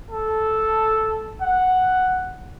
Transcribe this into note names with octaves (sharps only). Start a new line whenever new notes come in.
A4
F#5